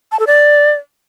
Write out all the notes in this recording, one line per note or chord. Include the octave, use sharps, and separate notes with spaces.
A5
A4
D5